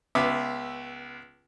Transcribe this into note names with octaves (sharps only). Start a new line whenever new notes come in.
C#2 B3 E5 D6